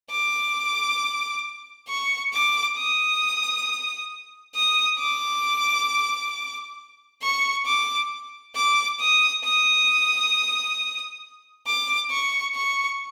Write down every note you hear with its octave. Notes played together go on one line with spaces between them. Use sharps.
D6
C#6
D6
D#6
D#6
D6
C#6
D6
D6
D#6
D#6
D6
C#6
C#6